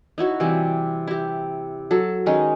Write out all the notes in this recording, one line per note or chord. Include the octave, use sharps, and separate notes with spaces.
D#4 E4 F#4 C#5
C3 E3 G3 G4
E4 G4
F#3 A4
D#3 G#3 C#4 D#4